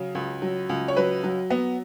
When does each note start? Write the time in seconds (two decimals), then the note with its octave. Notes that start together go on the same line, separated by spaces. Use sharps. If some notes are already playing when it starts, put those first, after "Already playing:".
Already playing: C#3 F#3
0.15 C#2
0.42 F#3
0.69 C#2
0.88 C#5
0.97 F#3 B4
1.24 F#3
1.50 B3